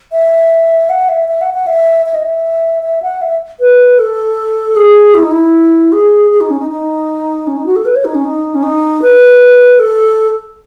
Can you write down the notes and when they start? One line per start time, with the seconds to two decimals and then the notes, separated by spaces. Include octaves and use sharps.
0.12 E5
0.89 F#5
1.09 E5
1.28 E5
1.41 F#5
1.54 F#5
1.67 E5
2.06 E5
2.14 D#5
2.23 E5
2.83 E5
3.02 F#5
3.21 E5
3.60 B4
3.99 A4
4.76 G#4
5.15 E4
5.23 D#4
5.31 E4
5.92 G#4
6.31 G#4
6.41 D#4
6.50 C#4
6.59 D#4
6.70 D#4
7.47 C#4
7.57 D#4
7.66 F#4
7.76 A4
7.85 B4
7.95 C#5
8.05 D#4
8.15 C#4
8.24 D#4
8.55 C#4
8.63 D#4
9.02 B4
9.79 A4